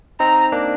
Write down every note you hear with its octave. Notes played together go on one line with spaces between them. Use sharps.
C4 D#4 A#5
A#3 D4